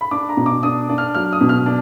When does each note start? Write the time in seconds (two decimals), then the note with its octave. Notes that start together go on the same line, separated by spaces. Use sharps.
0.01 B5
0.11 D4 D6
0.29 A#5
0.37 B2
0.46 D6
0.63 D4 D#6
0.89 D4
0.98 F6
1.15 F#3 F6
1.33 D#6
1.41 B2
1.49 F6
1.66 D4